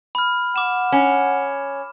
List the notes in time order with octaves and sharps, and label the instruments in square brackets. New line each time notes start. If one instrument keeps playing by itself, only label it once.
[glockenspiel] B5 F6
[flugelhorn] F#5 [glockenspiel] D6 E7
[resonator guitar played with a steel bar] C#4